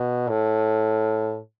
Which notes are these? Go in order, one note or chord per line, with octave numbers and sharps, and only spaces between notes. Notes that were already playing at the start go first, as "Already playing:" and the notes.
Already playing: B2
A2